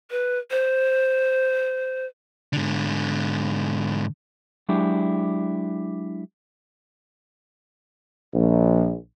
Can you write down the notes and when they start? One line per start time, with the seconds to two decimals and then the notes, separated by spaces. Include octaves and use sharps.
0.11 B4
0.51 C5
2.53 G#2 D3
4.69 F#3 G#3 D4 E4 G4
8.34 A#1